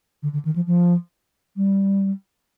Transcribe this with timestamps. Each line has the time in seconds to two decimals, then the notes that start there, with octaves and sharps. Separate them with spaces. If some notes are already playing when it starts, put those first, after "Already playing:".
0.23 D3
0.33 D3
0.45 D#3
0.56 F3
0.67 F3
1.57 G3